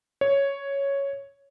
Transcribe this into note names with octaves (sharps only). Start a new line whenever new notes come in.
C#5